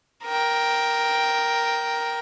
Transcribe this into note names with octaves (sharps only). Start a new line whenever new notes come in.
A#4 G5